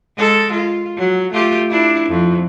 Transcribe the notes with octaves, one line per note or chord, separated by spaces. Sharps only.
G#3 A4
F4
F#3
A3 F4 G4
D4 E4
F2